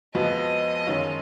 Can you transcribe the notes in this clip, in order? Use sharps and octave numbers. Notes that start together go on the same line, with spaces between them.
F2 F3 G#3 B3 F#4 D#5
F#2 D#3 G#3 C#4 F4